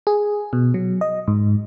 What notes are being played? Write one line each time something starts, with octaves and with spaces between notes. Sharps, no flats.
G#4
B2
F#3
D#5
G#2